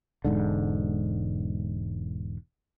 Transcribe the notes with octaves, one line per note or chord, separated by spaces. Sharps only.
E1 B1 G#2 D3